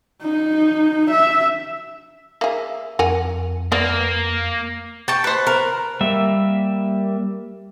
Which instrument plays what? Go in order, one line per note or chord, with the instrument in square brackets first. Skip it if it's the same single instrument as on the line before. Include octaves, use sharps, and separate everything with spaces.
[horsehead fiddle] D#4
E5
[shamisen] A#3 G#4 [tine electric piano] E5
[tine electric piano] F2 [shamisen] A#4 F#5 G#5
[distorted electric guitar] A#3 [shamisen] B3 D5
[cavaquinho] G5 C#6 [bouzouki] A5
[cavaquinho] B4 C5
[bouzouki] A#4
[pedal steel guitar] G3 A#3 E5